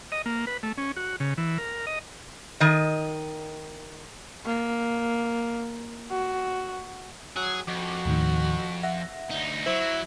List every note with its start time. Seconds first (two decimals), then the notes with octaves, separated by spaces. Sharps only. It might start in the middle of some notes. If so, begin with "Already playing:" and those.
0.12 D#5
0.26 A#3
0.47 B4
0.63 A3
0.78 C#4
0.96 F#4
1.20 C#3
1.38 E3
1.58 A#4
1.87 D#5
2.60 D#3 D#5
4.45 A#3
6.10 F#4
7.36 F#3 G#4
7.67 F2 F#4 D6
8.05 D#2 A2 D#3
8.83 E5 F#5 A#6
9.30 D2 D#4
9.66 F#3 E4 C5